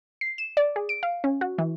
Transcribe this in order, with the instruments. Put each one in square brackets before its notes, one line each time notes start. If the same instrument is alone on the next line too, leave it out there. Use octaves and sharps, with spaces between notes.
[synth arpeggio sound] C7
E7
D5
G#4
D7
F5
C#4
F#4
E3